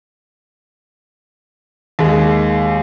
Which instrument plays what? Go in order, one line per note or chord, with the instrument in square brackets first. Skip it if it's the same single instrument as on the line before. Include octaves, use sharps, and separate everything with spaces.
[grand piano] D#2 G#3